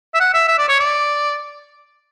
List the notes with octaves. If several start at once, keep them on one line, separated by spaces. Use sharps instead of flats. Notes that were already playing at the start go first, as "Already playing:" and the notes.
E5
F#5
E5
E5
D5
C#5
D5